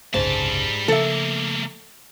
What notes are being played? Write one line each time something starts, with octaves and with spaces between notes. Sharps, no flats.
F#1 C2 G#2 C#3 G3 A5
C#3 F3 A3 A#3 A4 E5